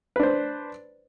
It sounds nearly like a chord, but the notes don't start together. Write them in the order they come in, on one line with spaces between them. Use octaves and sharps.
B4 D4 C5